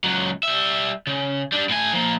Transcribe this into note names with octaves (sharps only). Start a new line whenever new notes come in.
C#2 F#3
G3 E5
C#3
G3 D4
A2 G#5
F3 A#3